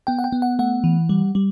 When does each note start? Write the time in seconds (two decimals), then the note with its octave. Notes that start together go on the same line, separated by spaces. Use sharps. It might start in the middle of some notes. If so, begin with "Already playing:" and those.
0.07 B3 G5
0.19 F#5
0.24 G5
0.32 B3
0.42 F#5
0.59 A3 F#5
0.84 E3
1.09 G3
1.35 G3